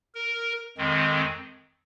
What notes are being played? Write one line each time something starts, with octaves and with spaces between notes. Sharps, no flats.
A#4
F2 D#3 G#3 C4